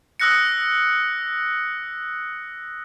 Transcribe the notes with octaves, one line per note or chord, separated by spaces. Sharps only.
D#6 E6 F#6 A#6 C#7